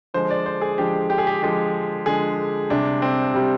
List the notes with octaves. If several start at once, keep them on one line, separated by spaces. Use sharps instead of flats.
D3 F3 G#3 C5
D5
C5
G#4
D3 F3 G#3 G4
G4
G#4
G4
D3 F3 G#3 G4
D3 F3 G#3 G#4
C3 G3 D4
C4
C3 G3